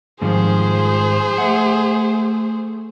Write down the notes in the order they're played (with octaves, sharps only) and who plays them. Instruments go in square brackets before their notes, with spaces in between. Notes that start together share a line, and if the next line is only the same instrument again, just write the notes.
[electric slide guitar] G#2 D#3 G3 [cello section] F3 [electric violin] G#4 C5
[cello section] A3 [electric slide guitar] E5 F#5